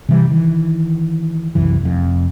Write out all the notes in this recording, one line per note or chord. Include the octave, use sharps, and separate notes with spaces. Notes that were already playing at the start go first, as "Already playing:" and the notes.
C3 E3 G3
D#3 E3
F#1 C2 F#2 E3
F1 F2